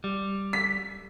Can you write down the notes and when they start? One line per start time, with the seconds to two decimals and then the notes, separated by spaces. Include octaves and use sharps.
0.04 G3
0.53 B6